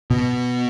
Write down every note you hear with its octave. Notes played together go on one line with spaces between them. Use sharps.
B2